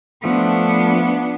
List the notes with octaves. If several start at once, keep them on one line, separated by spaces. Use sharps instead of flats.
F3 A3 B3 D4